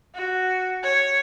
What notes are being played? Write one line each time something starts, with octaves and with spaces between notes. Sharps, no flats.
F#4
C#5